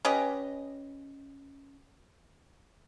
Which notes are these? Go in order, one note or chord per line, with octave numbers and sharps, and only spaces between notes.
C#4 G4 B4 D#5